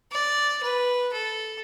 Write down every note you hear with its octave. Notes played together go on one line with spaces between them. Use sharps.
D5
B4
A4